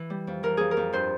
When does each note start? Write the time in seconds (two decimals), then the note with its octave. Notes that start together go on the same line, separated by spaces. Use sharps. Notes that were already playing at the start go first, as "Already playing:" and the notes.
Already playing: E3
0.10 G3
0.27 F2
0.43 E3 A#4
0.57 F2 G#4
0.71 A#4
0.77 F2
0.93 G2 C5